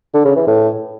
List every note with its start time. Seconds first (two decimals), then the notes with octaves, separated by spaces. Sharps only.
0.14 D3
0.25 C#3
0.36 E3
0.47 A2